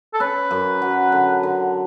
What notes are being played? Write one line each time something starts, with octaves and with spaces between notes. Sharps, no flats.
A4
C#4 B4
F#2
F#3
D3
D3